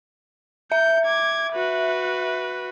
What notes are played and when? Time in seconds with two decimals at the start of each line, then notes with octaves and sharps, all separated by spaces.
0.72 E5 G6
1.05 D6 G#6
1.53 F#4 B4